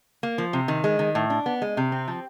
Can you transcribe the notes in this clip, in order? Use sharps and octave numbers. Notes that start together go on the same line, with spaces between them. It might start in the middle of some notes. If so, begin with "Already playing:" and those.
A#3
F3
C3
D#3
G#3
D#3
A2
D4
B3
G#3
C3
C4
F3